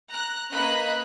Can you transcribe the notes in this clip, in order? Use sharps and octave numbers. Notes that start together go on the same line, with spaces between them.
A#5 F#6
A#3 C#4 B4 D#5 B5 F#6